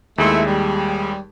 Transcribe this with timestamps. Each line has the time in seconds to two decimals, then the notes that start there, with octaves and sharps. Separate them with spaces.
0.18 D#2 G#3 A3 E4 C6
0.45 G3